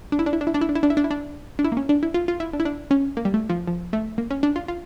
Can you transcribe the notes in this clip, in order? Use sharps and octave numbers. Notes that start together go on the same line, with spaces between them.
D4
E4
D4
E4
D4
E4
D4
E4
D4
E4
D4
E4
D4
E4
D4
D4
E4
A#3
C#4
D4
E4
F4
F4
E4
D4
E4
D4
C#4
A#3
G3
A3
F3
F3
A3
A#3
C#4
D4
F4
F4